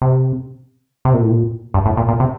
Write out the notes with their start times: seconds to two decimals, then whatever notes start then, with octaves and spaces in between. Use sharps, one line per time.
0.02 C3
1.05 C3
1.14 A#2
1.22 A2
1.30 A#2
1.74 G2
1.86 A2
1.97 A#2
2.08 A#2
2.20 C3